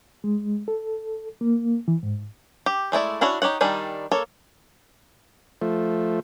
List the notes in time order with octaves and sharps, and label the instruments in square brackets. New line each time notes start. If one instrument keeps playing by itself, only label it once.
[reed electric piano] G#3
A4
A#3
E3
G#2
[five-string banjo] G4
G#3 A3 E4 D5
C#4 D4 E4 F#4 C#5
D#4 G4 C#5 F#5
D#3 G3 D4 G#5
A#3 A4 C#5
[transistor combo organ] F3 A3